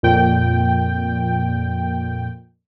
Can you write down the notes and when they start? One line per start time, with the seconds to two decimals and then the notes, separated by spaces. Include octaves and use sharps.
0.03 F2 A#2 G5